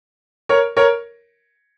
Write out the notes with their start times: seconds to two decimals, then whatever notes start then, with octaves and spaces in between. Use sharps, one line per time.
0.49 A#4 C#5
0.77 A#4 C#5